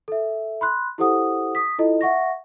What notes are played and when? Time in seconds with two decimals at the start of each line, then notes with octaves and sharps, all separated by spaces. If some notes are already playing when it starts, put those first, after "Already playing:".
0.08 A4 E5
0.61 B5 C6 F#6
0.98 E4 G4 A4 C5 F#5 D#6
1.55 D#6 B6
1.78 E4 F4 A4 D#5
2.01 E5 F#5 C#6 A#6